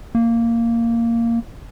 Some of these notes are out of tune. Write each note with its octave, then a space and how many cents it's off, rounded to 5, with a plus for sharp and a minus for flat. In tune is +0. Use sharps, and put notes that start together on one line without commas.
A#3 -10